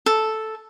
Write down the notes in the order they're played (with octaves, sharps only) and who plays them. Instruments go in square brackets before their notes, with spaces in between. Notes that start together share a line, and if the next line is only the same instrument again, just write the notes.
[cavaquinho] A4